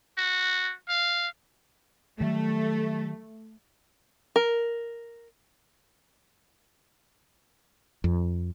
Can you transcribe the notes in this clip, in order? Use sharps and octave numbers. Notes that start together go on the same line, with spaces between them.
F#4
F5
D#3 F#3 G3 A3
A#4
F2